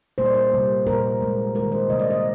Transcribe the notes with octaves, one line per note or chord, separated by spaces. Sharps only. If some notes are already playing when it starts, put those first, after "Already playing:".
A#2 G3 A#3 C5
D5
C5
C3 G3 A#3
A#2 G3 A#3 A#4
A#2 G#3
D#3 G#3 A#4
C5
C3 G3 A#3 D#5
D5
D#5